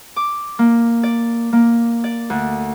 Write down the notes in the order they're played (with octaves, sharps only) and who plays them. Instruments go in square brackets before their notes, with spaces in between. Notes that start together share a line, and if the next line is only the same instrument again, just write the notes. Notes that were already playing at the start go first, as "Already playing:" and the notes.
[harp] D6
A#3
D5
A#3
D5
D2